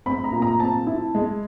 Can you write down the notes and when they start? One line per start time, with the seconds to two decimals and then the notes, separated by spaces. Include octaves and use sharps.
0.06 C4 B5
0.24 A#5
0.32 A#2
0.42 A#5
0.60 C4 A5
0.87 E4
1.15 G#3